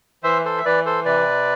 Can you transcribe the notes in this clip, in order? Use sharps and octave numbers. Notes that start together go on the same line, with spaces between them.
E3 C5 E5
A4 C5
E5
E3 B4 D5
A4 C5
C3 B4 D5